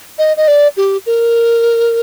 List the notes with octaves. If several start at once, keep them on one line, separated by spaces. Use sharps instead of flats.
D#5
D#5
D5
G4
A#4